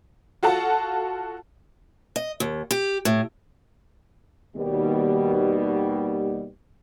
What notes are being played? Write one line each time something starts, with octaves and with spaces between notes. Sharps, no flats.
F4 F#4 A4 F#5 A5
D#5
D#2
G4
A2
D#2 B2 G3